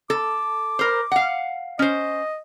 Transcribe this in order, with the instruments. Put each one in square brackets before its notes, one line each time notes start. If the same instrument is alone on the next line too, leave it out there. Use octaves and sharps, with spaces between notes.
[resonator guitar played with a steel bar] A4 [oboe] D6
[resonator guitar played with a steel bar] A#4 C5
F5 F#5
[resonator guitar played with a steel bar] C#4 C5 [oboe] D#5